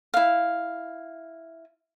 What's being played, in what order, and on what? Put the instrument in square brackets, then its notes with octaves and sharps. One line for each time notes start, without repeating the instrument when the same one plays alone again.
[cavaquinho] E4 F5